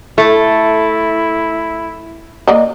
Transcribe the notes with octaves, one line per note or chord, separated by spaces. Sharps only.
A3 E4
A#3 D5 D#5